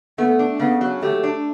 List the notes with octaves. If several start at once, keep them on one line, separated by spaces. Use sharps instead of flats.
A3 B3
D4
C#3 B3
F#3
A3 G4
D4